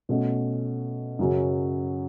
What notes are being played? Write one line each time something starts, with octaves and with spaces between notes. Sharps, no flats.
B2 A3 C#4
F#2 C#3 F#3 C#4